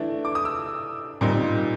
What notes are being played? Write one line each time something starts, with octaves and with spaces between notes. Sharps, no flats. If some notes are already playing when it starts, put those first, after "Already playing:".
Already playing: E3 A3 D4
D6
D#6
E6
A#2 G3 C4 D#4